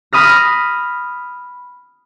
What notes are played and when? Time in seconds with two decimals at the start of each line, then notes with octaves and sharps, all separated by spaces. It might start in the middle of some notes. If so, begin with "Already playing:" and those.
0.13 B5 D#6 F6 A#6